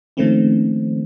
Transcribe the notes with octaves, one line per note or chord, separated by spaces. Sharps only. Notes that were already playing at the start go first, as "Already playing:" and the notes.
D#3 F3 A3 A#3 C4 C#4